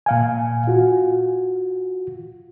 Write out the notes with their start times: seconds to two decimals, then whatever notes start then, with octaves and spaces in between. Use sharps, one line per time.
0.06 A#2 F5 G#5
0.67 F4 F#4